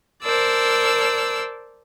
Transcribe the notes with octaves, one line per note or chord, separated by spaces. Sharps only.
A#4 C5 D5 A5 E6